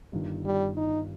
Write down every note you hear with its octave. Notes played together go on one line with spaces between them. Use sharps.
G1 G2 D#3
G3
D#4